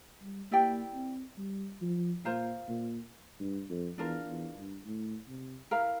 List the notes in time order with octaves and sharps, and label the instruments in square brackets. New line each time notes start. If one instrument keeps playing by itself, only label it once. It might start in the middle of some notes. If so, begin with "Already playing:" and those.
[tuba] G3
[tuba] A#3 [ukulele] E4 G4 D5 G5
[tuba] C4
G3
F3
[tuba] A#2 [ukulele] F4 C5 F5 A#5
[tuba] A#2
G2
F2
[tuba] E2 [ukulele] D4 F4 A#4
[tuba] E2
G2
A2
C3
[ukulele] E4 A#4 F5 A#5